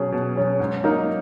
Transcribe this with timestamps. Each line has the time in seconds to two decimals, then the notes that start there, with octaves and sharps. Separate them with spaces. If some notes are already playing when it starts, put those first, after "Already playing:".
Already playing: B2 F#3 C#4 G#4
0.12 B2
0.35 F#3 C#4 G#4
0.60 G#2
0.84 F#3 A#3 D#4 A#4